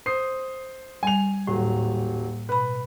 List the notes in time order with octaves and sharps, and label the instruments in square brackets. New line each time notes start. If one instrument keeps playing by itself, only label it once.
[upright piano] C5 D#6 C7
[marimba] G3 [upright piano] G#5 F7
[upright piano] D#1 F#3 [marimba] A2
[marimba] B2 B5 [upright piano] B4